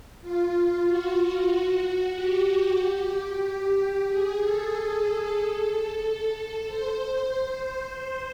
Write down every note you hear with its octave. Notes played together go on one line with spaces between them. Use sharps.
F4
F#4
F#4
G4
G#4
A4
A4
C5
C5